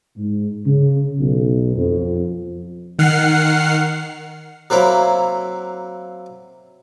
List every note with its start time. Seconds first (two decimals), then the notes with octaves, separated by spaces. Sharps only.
0.17 G#2
0.66 C#3
1.18 B1
1.75 F2
2.99 D#3 F#5 F6 C7
4.70 F#3 A#3 C4 E4